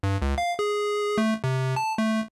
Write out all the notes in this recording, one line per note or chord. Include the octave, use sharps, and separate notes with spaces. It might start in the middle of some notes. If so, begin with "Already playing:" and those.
G2
C#2
F5
G#4
A3
C3
A5
A3